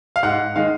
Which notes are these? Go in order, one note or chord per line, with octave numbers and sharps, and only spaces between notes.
F5
G#2 F#5
D#3 G#3 F5